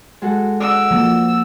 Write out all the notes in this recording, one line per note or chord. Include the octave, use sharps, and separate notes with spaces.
G#3 F#4 A4
D5 F#5 D6 E6
F3 A#3